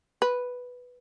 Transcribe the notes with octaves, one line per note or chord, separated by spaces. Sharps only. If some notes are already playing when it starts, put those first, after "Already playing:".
B4